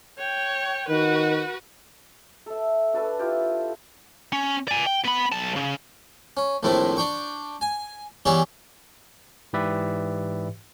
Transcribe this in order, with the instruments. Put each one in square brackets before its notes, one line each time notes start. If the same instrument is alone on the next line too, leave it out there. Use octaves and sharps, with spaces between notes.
[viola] C#5 G5
[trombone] D#3 [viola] F#4 B4
[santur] A4 E5
D4 F#4 A4 B4
E4 F4 G4
[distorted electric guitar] C#4
D5 G#5
G5
B3 B5
B1 A5
C#3
[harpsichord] C#4
A#1 A2 D#3 A3 C4 E4
D4 G5 C#6
G#5
E3 G3 B3 E4 G#4 C#5
[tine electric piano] G#2 E3 G4 B4 D5 E5